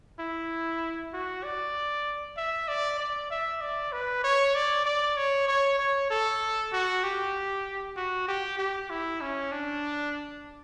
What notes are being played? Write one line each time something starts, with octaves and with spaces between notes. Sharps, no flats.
E4
F#4
D5
E5
D5
D5
E5
D5
B4
C#5
D5
D5
C#5
C#5
C#5
A4
F#4
G4
F#4
G4
G4
E4
C#4
D4